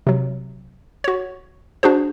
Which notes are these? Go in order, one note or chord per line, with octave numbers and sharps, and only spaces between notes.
C3 F#3
F#4 C#5
D4 F#4 G#4 C5